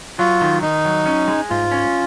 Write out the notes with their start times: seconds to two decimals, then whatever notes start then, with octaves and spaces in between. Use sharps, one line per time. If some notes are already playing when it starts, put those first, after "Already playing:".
0.19 F#3 F4
0.41 D#3
0.62 D#3 D#4
0.85 F#3
1.06 C#4
1.28 G#3
1.50 G#2 F4
1.71 C#4